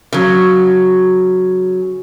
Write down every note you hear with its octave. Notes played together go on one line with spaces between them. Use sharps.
C#3 F#3